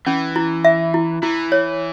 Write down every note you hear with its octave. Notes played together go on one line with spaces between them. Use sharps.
E3 C#4
E4
E5
E4
E3 E4
C#5